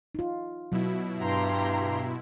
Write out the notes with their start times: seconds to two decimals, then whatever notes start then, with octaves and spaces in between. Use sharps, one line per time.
0.15 D#4 F4
0.72 B2 F#3 E4
1.20 G2 G4 A#5 C6